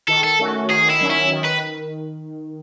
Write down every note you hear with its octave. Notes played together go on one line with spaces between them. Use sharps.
D#3 A4
A4
A3 C#4 F#4
D#3 G#4
E4
F#3 C#4
E4
D#3
B4